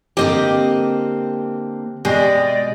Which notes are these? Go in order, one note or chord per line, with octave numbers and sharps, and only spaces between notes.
D3 A#3 C4 G4 D#5
B2 G#3 G4 G#4 D5 D#5